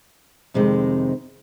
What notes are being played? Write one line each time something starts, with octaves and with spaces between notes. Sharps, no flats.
F2 C3 D#3 G#3